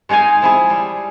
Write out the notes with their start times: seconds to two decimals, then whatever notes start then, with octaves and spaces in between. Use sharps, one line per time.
0.09 G#3 D#4 G#4 F5 G#5
0.42 F3 E4 G#4
0.70 G3